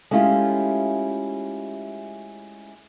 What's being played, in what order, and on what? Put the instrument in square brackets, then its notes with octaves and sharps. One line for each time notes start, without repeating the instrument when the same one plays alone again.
[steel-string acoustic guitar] G#3 A3 C#4 E4 F4 G4